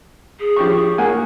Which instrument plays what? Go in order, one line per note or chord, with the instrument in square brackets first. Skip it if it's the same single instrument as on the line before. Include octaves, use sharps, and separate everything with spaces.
[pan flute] G#4
[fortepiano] F3 G4 C#6
A#3 F#5 G#5